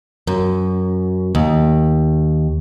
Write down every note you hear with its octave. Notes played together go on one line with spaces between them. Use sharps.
F#2
D#2